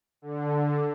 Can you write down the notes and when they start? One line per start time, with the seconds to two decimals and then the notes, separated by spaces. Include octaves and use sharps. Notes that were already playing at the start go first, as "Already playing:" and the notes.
0.22 D3